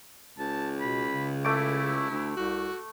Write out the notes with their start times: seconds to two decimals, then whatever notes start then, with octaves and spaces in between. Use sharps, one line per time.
0.39 C#2 A5
0.80 B2 B5
1.13 C#3
1.45 A3 E4 D6
2.10 D2
2.36 C2 F#4